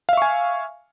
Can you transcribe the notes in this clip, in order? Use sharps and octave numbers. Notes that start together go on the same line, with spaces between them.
E5 F5 G#5 C#6